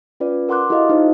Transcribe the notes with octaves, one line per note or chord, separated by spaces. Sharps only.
C#4 F4 B4 D5
A#4 F#5 C6 D6 F#6
E4 F#4 G4 A4 D#5 F5
D#4 F4 G4 C5